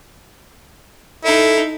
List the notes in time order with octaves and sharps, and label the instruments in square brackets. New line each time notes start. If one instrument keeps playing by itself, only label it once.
[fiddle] D#4 [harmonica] E4 [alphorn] A4